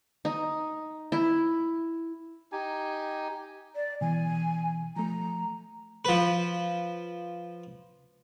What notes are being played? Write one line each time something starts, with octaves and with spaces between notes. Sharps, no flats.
D#4
E4
D#4 G4 G#5
D5
B2 E3 G#5
F3 A3 A#5
F3 B4